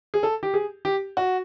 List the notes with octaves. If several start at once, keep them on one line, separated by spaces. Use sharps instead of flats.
G#4
A4
G4
G#4
G4
F#4